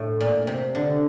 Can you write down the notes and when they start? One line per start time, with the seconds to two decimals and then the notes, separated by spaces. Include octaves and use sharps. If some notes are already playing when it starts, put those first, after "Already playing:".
Already playing: A2
0.20 A#2
0.47 C3
0.75 D3